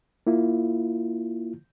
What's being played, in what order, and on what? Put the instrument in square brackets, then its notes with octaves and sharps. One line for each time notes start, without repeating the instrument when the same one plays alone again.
[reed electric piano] A#3 E4 F4